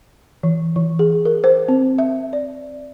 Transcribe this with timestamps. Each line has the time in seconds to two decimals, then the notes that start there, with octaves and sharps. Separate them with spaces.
0.43 E3
0.76 E3
0.99 G#4
1.25 A#4
1.44 C5
1.69 C4
1.98 E5
2.33 D5